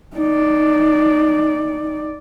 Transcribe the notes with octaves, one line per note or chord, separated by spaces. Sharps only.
D#4 D5